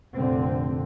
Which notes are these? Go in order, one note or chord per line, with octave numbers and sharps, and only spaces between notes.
F1 A#2 D3 C4